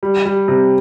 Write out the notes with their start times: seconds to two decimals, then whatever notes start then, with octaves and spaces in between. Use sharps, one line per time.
0.03 G3
0.25 G3
0.48 C3